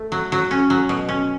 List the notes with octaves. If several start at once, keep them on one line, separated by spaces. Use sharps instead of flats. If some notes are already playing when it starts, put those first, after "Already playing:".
Already playing: A3
F#3
F#3
C#4
F#3
B2
C#4